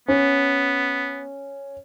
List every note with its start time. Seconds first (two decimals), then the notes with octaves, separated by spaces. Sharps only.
0.08 B3 C#4